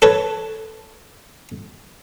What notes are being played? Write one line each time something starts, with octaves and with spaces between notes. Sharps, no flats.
A4 B4 C#5